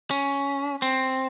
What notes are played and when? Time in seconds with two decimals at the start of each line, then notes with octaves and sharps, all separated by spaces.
0.11 C#4
0.82 C4